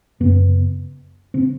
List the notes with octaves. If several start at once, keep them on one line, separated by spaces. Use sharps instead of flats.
F#2 C#3 B3
C#3 C4